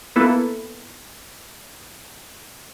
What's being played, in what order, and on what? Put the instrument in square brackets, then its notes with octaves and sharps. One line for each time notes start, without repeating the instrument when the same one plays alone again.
[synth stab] A#3 B3 E4 A4 B4